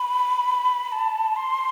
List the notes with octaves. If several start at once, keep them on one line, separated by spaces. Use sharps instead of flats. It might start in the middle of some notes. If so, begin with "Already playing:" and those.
Already playing: B5
A5
C6